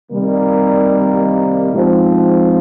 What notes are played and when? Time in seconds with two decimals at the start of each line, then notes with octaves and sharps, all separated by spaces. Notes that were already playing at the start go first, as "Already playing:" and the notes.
0.11 C3 D#3 G3 A#3
1.71 G#2 F3 C4